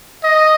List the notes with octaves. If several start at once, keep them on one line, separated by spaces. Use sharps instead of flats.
D#5